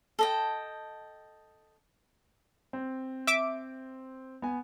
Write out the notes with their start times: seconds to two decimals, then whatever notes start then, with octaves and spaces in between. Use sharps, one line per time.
0.19 A4 D#5 G5
2.73 C4
3.27 E5 D6 D7
4.42 B3 G#5